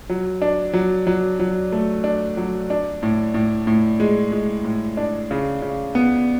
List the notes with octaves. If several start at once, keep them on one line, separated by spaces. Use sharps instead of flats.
F#3
D4
F#3
F#3
F#3
A3
D4
F#3
D4
A2
A2
A2
G#3
G#3
A2
D4
C#3
C#3
B3